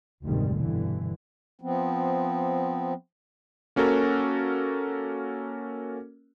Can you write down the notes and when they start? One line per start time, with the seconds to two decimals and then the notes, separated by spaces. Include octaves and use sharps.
0.24 F1 D2 G#2 C3 D#3 G3
0.58 G2 B2 D3 E3
1.61 F3 B3 C4
3.76 A#3 C#4 F#4 A4 A#4